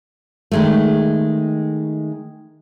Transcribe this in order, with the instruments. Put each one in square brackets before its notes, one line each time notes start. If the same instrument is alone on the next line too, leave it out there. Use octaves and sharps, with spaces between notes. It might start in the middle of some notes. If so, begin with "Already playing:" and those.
[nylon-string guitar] D#3 G#3 A3